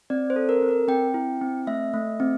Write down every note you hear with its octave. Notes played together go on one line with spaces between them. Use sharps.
C4 D5
C5
A4
A#4
C4
A#4
C4 G5
E4
C4
A3 E5
A3
C4